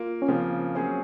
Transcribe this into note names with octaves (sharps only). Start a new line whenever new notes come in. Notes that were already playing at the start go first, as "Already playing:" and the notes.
Already playing: A#3 F4
C#4
C#3 F3 A#3 C4
F#3 A#3 C#4 G#4 C5